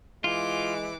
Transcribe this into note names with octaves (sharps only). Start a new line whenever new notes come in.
E3 G#3 F4 D6